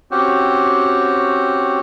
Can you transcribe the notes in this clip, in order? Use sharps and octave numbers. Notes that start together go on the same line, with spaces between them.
C4 C#4 F#4 G4